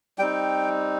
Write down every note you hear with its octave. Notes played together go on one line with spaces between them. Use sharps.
G3 C4 D#4 G5